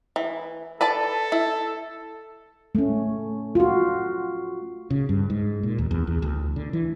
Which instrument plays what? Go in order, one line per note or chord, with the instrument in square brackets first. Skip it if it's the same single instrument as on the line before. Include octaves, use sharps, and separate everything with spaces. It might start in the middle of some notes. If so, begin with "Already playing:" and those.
[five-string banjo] E3
[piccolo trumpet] A4 [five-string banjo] B4 D5 A5
[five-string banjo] E4
[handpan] A3 C#4
F4 F#4
[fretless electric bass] C#3
G2
G#2
A#2
D#2
E2
E2
D2
D3
E3